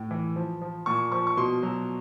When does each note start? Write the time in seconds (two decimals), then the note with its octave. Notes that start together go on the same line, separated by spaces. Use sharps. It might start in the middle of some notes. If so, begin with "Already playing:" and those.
Already playing: A2
0.11 E3
0.36 F3
0.62 F3
0.86 A#2 C#6
1.12 F3 C#6
1.27 C#6
1.37 B2 C6
1.63 F#3